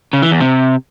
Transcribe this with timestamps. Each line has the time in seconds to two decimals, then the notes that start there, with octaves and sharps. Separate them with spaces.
0.13 C#3
0.22 E3
0.31 E2
0.40 C3